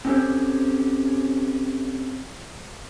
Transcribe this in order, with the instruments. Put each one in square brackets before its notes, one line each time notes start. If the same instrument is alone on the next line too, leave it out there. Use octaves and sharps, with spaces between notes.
[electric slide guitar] C4 C#4 G4 A4 C5 C#5